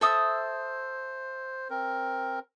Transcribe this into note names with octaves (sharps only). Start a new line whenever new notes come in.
A4 C5 E5 D#6
C4 A#4